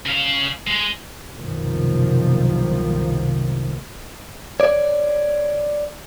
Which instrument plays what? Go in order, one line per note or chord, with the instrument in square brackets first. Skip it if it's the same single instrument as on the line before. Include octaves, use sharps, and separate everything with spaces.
[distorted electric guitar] C#3 F5
G#3
[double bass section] F#1 C2 B2 D#3 F3 A#3
[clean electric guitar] C#5 D5